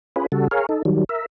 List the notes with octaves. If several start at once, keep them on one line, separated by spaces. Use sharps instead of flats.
C#4 F4 G#4 B4
C#3 G3 F#4 A4
G#4 A#4 C#5 F5
D#4 A4
D#3 F#3 G3
A#4 E5